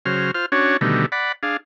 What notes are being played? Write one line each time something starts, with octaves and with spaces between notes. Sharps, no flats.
C#3 F#3 C5 F6
F4 C5 F6
C#4 D4 F#4 C#5
B2 D3 D#3 G3 A3
D5 F#5 B5
D4 G#4 F5